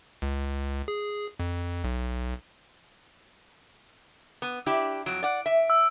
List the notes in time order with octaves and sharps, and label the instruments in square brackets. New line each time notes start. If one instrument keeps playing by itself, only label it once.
[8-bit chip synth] C#2
G#4
F2
B1
[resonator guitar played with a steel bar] B3
D4 E4 G4
[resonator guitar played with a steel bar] F2 F#3 [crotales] D7
[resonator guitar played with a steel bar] D5 F#5
E5
[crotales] E6